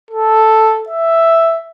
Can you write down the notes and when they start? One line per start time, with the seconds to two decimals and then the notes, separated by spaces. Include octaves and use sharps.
0.11 A4
0.89 E5